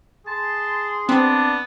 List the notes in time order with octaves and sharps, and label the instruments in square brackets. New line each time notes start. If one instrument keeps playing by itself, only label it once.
[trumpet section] G#4 C6 [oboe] A5
[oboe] B3 [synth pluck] C4 [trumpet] D4